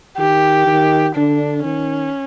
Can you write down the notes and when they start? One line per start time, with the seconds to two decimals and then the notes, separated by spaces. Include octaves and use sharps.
0.18 D#3 G4
0.67 D#3
1.16 D3 D4
1.65 D#3 C#4